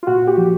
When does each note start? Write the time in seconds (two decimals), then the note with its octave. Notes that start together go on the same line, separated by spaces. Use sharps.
0.03 F4
0.07 A#2 F#4
0.22 A#2
0.27 G4
0.37 F3